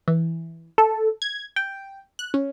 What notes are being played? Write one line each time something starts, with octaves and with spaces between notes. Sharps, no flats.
E3
A4
G#6
G5
F#6
C#4